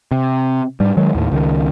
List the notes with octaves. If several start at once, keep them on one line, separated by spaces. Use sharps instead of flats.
C3
G#2 G3
D#3 F#3 G#3
D#2 A2
C#2 D#3